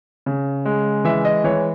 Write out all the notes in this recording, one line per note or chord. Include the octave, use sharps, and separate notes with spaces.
C#3
G#3
E3 E5
D#5
E3 C#5